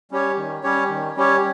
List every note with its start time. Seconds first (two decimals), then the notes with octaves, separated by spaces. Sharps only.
0.11 G3 C#4 G4 C#5
0.37 D#3
0.63 G3 C#4 G4 C#5
0.90 D#3
1.16 G3 C#4 G4 C#5